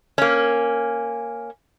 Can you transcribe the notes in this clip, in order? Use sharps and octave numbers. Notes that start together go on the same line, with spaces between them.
A#3 C#4